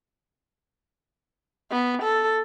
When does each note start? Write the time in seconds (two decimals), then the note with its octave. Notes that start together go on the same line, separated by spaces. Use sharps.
1.71 B3
2.02 A4